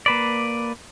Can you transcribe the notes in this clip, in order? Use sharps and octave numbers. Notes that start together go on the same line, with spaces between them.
A#3 B4 D5